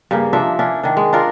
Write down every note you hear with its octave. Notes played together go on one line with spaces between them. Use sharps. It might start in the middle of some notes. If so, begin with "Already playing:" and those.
G2 C#3 A#3
F3 D4 D#4 E5
C#4 D4 E4
D#3 D4
G#3
D4 D#4 F4 A#4